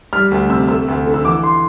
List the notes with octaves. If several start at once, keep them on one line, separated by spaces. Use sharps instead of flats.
G3 F6
D2
C3 E6
A3 E6
D2
D3
E6
E3 D6
C6